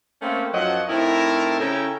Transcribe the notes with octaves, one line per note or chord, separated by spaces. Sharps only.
A3 A#3 C4 C#4
F#2 F3 F#3 D#5 F#5
A2 C4 D#4 E4 A#4 A5
C#3 C#4 E4 A4 G5 A#5